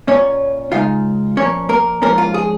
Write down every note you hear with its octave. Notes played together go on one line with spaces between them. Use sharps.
A#2 A#3 C#4 F4 C#5
C#3 G#3 D#4 F4 F5
A#2 F3 A#3 C#4 C#5
A#3 A#4
G#2 F3 A#3 C#4 F4 A#4
F4
G#4